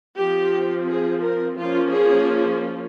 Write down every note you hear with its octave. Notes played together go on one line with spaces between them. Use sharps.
F3 C4 G4
G#4
A#4
F3 A#3 C#4 F4
G#4